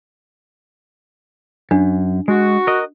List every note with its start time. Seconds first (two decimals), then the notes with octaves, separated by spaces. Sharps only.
1.71 F#2 D4
2.28 G#3 F#4
2.67 A#4 D#5